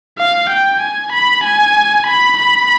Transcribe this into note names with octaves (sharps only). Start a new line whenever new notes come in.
F5
G5
G#5
B5
G#5
B5
B5